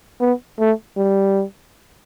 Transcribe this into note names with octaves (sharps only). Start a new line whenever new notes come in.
B3
A3
G3